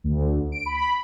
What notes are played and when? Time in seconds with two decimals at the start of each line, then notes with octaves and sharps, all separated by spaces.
0.04 D2
0.52 D7
0.66 B5